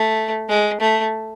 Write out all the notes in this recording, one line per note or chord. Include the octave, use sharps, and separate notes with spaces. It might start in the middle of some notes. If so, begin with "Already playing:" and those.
Already playing: A3
G#3
A3